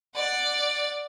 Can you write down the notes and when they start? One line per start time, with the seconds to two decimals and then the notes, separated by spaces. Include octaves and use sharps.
0.15 D5 F#5